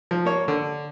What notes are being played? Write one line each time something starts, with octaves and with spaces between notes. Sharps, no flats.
F3
A#3 C#5
D3